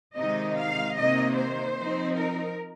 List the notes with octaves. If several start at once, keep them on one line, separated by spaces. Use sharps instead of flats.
C3 D#3 G#3 D#4 D#5
F5
C3 D#3 A#3 D#4 D#5
C5
F3 C4 D#4
A#4